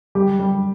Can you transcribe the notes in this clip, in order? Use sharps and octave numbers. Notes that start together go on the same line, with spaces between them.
G3 G4
G3